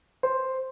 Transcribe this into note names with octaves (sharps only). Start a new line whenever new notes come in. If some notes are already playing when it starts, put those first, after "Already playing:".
C5